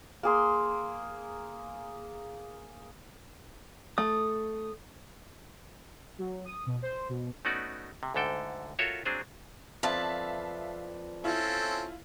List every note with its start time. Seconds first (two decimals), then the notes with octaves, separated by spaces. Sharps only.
0.23 A#3 G#4 C6
3.98 A3 D#6
6.18 F#3
6.45 D#6
6.66 B2
6.82 C5
7.09 B2
7.45 A3 B3 C#4 D#4 F#4 D5
8.03 C3
8.14 D2 G#2 D3 A4 G5
8.79 F4 F#4 A4 A#4 C#5 E5
9.05 F#3 C4 D4 G#4 C5
9.83 F2 B4 D5 E5 F5 A5
11.24 C4 C#4 E4 F4 A4